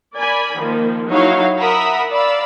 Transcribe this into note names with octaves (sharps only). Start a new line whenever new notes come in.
A#4 D5 G#5 B5
D#3 F3 A#3
F#3 D#4 E4 F#4 C#5 F5
A#4 E5 F#5 B5 D#6 E6
D5 F5 B5 E6